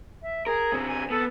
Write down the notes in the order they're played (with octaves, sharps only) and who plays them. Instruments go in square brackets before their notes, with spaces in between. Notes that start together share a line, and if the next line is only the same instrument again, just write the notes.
[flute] E5
[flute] G#4 [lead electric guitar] A#4
[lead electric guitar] D3 C4
[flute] G#5
[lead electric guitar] B3 [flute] A4